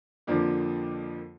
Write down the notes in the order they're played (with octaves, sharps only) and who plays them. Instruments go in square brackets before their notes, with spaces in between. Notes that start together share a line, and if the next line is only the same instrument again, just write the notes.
[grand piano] F2 D3 F3 A#3 D4